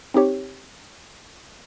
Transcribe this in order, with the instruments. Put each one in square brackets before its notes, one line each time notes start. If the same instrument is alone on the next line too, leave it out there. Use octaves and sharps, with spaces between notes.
[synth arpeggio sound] C4 D#4 G4 C#5